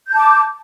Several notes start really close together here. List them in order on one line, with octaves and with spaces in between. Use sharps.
G6 A5 D6